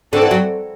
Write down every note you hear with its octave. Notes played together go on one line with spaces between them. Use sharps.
D3 C4 F#4 A4 D5 F#5
E3
F#3